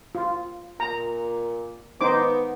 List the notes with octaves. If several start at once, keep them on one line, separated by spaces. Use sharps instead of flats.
F4
A#2 A#5
B3 D#4 C5 D6